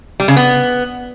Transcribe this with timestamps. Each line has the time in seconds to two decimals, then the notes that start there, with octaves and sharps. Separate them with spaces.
0.20 G3
0.28 C#3
0.37 B3